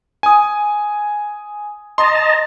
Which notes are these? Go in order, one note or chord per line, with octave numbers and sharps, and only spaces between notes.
G#5 D#6
D#5 A5 A#5 C6